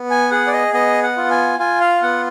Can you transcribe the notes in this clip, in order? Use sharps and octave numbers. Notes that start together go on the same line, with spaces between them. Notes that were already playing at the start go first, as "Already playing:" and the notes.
Already playing: B3
G#5
G#4 F#5
D5
D#5
B3 D#5
F#5
F4
G#5
F4 G#5
F5
B3 F#5